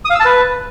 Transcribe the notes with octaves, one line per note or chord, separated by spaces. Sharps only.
D#6
F5
E6
A5
B4